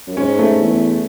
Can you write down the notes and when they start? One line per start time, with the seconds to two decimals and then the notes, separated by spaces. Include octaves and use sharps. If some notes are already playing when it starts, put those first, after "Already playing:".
0.07 F#2
0.17 G#2 C#4
0.39 A3
0.60 E2